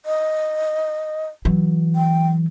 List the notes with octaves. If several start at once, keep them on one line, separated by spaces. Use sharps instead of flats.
D#5
E3 F#3
G5